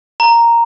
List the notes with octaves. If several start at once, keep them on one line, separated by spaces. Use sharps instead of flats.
A#5